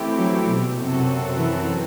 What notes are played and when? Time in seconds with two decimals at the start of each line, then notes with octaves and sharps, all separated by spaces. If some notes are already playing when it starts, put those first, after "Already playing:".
Already playing: E3 A3 C4 E4 G4
0.16 F#3
0.47 B2
0.76 F#2 C3 F#3 C4 F#4 A4
1.37 E3